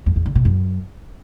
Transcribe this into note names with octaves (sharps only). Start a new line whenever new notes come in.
F2
E2
D3
B2
F#2